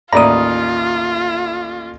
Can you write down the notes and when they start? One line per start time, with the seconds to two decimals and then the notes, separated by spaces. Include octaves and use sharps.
0.13 A1 D#2 F4 D5 E5 A#5 B5 D#6